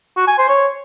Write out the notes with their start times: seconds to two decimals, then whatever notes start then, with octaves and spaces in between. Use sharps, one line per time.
0.17 F#4
0.27 G#5
0.38 C5
0.49 C#5